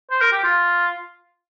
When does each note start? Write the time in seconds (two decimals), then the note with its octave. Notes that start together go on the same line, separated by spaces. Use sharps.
0.11 C5
0.21 A#4
0.33 G4
0.44 F4